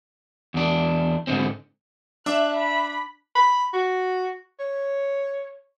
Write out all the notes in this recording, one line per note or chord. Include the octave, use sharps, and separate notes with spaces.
E2 D4
G#2 D3 C4
D4 E5 D6 F#6
B5
B5
F#4
C#5